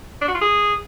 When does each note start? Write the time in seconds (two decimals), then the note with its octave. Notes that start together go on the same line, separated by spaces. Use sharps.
0.21 D4
0.28 F#4
0.34 F4
0.41 G#4